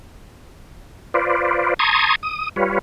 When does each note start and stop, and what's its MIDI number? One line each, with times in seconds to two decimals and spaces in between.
1.14 1.74 65
1.14 1.74 71
1.14 1.74 72
1.14 1.74 74
1.79 2.16 81
1.79 2.16 82
1.79 2.16 84
1.79 2.16 85
1.79 2.16 87
1.79 2.16 92
2.23 2.49 87
2.56 2.79 55
2.56 2.79 65
2.56 2.79 71
2.56 2.79 73